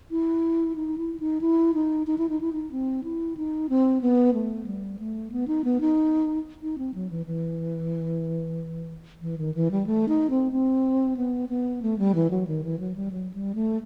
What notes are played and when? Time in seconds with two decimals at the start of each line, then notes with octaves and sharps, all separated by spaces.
0.11 E4
0.76 D#4
0.98 E4
1.20 D#4
1.41 E4
1.74 D#4
2.07 D#4
2.18 E4
2.29 D#4
2.41 E4
2.53 D#4
2.72 C4
3.04 E4
3.37 D#4
3.69 C4
4.01 B3
4.34 A3
4.66 G3
4.99 A3
5.32 B3
5.48 D#4
5.64 B3
5.81 D#4
6.62 D#4
6.78 C4
6.94 F#3
7.11 E3
7.26 E3
9.22 E3
9.38 D#3
9.54 E3
9.71 G3
9.87 A3
10.08 D#4
10.30 C4
10.52 C4
11.17 B3
11.49 B3
11.82 A3
11.99 G3
12.15 E3
12.30 F#3
12.47 D#3
12.64 E3
12.79 F#3
12.96 G3
13.12 F#3
13.34 G3
13.55 A3